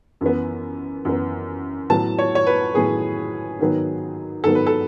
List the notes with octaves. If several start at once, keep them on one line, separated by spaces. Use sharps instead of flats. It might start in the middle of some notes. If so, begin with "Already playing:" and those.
F#2 E3 B3
F#2 E3 B3
A2 F#3 B3 A5
C#5
C#5
B4
A2 F#3 B3 G#4
G#2 D#3 F#3 B3
G#2 D#3 F#3 B3 A4
B4
A4